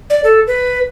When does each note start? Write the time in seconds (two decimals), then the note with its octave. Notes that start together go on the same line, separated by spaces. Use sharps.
0.10 D5
0.24 A4
0.47 B4